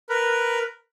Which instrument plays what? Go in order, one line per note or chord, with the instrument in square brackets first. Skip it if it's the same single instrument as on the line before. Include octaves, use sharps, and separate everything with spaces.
[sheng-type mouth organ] A#4 B4